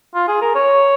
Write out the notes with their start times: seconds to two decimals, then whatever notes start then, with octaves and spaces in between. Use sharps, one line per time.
0.15 F4
0.28 G#4
0.42 A#4
0.55 C#5